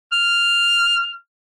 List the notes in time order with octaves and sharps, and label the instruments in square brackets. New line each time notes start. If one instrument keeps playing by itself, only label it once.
[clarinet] F6